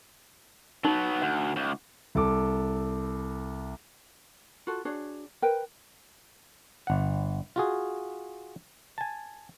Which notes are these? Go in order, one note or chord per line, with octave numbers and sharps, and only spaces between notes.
F#3 B3 D#4
D2 F#5
C#2
C2 A4 D6
F4 F#4 A4
D4 F#4 G#4 C#5
A#4 B4 G5
G1 F#5
F4 F#4 G#4
G#5 A5